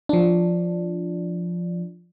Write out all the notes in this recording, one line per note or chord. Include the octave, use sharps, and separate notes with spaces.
F3 D4